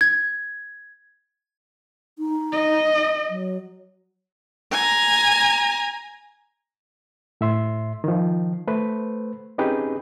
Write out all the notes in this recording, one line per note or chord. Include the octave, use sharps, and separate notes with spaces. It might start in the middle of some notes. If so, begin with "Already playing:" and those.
G#6
D#4
D#5
F#3
G#5 A#5
A2 E5 C6
D#3 F3
A3 B4 C5
C4 C#4 D#4 G4 G#4 B4